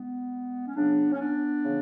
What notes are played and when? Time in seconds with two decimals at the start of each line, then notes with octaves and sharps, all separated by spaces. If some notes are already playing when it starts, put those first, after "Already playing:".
Already playing: G#3 B3
0.67 C#4
0.75 C#3 F#3 B3 D4
1.12 C#4
1.18 B3 D4
1.61 C#3 E3